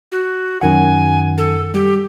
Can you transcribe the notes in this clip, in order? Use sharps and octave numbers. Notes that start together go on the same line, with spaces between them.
F#4
F#2 D#3 F#5 G#5
A4
G3 G4